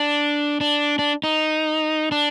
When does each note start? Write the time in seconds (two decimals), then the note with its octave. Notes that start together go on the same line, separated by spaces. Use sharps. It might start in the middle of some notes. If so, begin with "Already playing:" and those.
Already playing: D4
0.61 D4
0.99 D4
1.24 D#4
2.12 D4